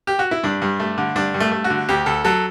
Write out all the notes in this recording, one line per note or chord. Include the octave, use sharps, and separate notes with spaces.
G4
F#4
E4
G2 D4
G2
A3
D3
G2 D4
G2
A3
A3
F#4
D3
D2 G4
D2 A4
F#3 A4